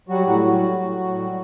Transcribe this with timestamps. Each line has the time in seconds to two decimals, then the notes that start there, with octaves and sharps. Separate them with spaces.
0.09 F#3 G3 F#4
0.26 A2 F#3 F#4
0.45 G3
0.63 A2
0.81 A2
0.98 A2
1.17 G3